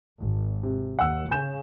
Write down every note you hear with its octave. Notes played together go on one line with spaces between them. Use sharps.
G#1
C3
D#2 F#5 E6
C#3 G#5 G6 E7